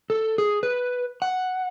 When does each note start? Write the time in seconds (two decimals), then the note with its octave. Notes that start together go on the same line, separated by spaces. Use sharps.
0.10 A4
0.38 G#4
0.63 B4
1.22 F#5